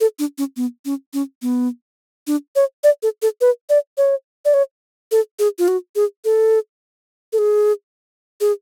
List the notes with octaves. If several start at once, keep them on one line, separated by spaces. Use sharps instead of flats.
A4
D4
C#4
B3
C#4
C#4
B3
D4
C#5
D5
A4
A4
B4
D5
C#5
D5
C#5
A4
G#4
F4
F#4
G#4
A4
A4
G#4
G#4